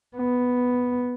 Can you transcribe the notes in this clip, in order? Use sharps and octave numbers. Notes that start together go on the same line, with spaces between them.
B3